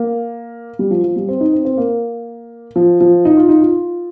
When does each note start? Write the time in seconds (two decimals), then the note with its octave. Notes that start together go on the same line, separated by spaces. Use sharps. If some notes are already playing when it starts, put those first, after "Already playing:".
Already playing: A#3
0.79 G3
0.91 F3
1.04 F3
1.16 G3
1.29 C4
1.41 D#4
1.53 C4
1.65 C4
1.77 A#3
2.76 F3
3.01 F3
3.25 D#4
3.37 F4
3.49 D#4
3.62 F4